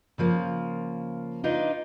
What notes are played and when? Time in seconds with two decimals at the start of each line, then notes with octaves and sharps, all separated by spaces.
0.18 C#3 F3 A#3
1.44 D4 D#4 F4 B4